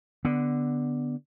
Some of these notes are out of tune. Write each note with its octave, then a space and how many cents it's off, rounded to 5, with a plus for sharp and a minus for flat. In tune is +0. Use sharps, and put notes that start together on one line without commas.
D3 +0 B3 +0